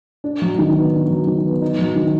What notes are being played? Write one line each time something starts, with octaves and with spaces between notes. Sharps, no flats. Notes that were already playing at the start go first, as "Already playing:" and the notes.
D4
F#3
D#3
B3
D4
F#3
D#3
B3
D#4
F#3
D#3